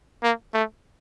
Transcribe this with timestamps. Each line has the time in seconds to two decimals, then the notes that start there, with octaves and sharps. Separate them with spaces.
0.23 A#3
0.54 A3